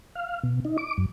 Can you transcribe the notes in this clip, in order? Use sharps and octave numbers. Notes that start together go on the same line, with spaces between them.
F5
B2
D#4
D6
F#2